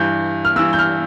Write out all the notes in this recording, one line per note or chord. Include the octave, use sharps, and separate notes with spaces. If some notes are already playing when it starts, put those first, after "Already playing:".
Already playing: G2 E3 G6
F6
G2 E3 E6
G6
F6